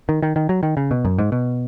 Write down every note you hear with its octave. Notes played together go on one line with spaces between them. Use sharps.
D#3
D#3
D#3
F#3
D#3
C#3
B2
F#2
G#2
B2